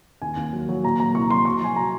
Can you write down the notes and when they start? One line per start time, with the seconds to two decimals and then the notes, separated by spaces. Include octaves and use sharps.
0.22 D#2 G#5
0.37 D#2
0.53 F#3
0.69 F#3
0.84 A#2 A#5
1.00 F#3 A#5
1.15 C2 C#6
1.30 F#3 C6
1.45 F#3 C#6
1.62 F#3 G#5
1.76 F#3 A#5